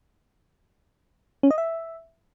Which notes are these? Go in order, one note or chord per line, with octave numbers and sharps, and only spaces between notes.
C#4
D#5
E5